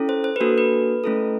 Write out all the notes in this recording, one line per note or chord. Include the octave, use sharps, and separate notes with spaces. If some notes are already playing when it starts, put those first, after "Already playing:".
Already playing: C#4 E4 A4
C5
C5
A#3 D4 F#4 A4 B4
B4
A3 C#4 E4 A4